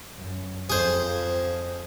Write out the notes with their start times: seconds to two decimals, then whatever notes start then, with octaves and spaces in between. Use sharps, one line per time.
0.15 F#2
0.70 F2 G#4 C5